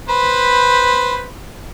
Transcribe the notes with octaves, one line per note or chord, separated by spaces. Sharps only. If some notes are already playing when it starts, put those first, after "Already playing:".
B4 C5 B5